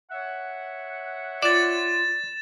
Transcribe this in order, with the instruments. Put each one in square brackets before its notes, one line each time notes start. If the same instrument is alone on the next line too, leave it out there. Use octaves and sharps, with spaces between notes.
[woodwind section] C#5 E5 F#5
[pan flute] F4 [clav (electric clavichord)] D5 [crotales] A6 E7